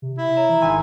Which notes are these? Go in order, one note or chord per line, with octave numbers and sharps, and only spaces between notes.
C3
E4
C#5 A#5 E7
E3
G#1 G#5 C6 E6